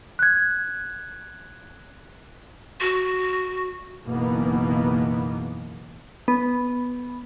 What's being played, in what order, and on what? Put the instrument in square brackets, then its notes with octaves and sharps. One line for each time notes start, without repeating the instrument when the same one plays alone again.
[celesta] F#6 G#6
[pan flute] F#4
[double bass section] F#1 B2 D#3 E3 A#3 B3
[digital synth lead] B3